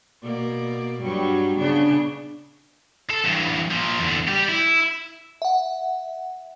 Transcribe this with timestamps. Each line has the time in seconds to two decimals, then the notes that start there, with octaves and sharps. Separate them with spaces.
0.23 B2 A#3 D5
1.03 G2 F#3 G3
1.59 C#3 B3 D4
3.11 A4
3.25 E2 G2
3.71 A#2 F3
3.99 E2 D3
4.28 G3 G4
4.49 E4
5.42 E5 F#5